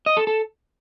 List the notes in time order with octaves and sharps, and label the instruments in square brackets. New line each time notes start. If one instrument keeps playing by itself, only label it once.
[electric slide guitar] D#5
A4
A4